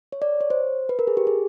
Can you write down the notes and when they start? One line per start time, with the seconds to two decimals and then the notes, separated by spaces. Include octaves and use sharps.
0.12 C#5
0.22 D5
0.40 C#5
0.50 C5
0.89 B4
0.99 A#4
1.07 G#4
1.17 G4
1.27 G#4